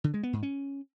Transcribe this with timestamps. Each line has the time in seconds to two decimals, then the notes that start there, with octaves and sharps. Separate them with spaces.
0.04 D3
0.14 G#3
0.23 B3
0.33 G#2
0.43 C#4